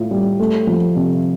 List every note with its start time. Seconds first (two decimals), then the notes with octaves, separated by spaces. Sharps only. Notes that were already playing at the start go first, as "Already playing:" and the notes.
Already playing: A2 F4
0.11 G3
0.40 A3
0.67 F3
0.96 C3